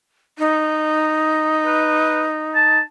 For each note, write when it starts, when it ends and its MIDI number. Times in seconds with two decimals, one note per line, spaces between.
0.39 2.78 63
1.66 2.22 71
2.55 2.81 81